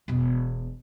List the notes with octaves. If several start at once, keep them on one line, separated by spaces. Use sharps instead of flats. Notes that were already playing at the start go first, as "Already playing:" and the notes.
E1 B2